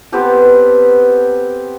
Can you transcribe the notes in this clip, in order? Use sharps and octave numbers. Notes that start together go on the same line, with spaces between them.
B3 C4 G4 A4